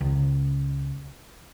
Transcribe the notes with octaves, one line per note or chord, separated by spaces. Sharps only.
C#2